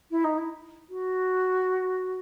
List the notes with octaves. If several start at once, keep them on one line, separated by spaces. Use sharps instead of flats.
E4
D#4
E4
F#4